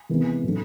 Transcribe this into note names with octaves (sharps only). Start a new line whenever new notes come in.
C3 E3 G#3 B3 D#4
A2 F#3 A3 D4